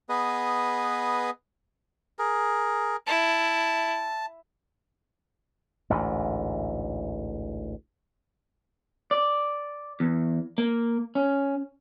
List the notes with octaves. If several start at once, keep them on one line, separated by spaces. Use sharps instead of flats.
B3 G#4 B4 D#5
G#4 A#4
E4 A5
A1 D2 G#2
D5
E2
A#3
C#4